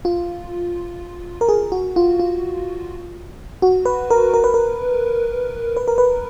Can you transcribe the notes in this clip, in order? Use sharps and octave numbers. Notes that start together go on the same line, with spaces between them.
F4
A#4
G#4
F#4
F4
F4
F#4
B4
A#4
A#4
B4
A#4
B4
A#4
B4